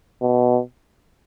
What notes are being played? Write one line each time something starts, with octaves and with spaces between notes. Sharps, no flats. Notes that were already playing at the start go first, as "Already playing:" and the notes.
B2